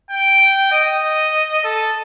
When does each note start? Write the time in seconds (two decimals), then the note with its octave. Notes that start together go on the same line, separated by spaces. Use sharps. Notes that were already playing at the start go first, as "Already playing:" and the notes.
0.10 G5
0.72 D#5
1.64 A4